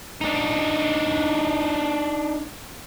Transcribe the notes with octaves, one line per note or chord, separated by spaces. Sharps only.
D4 D#4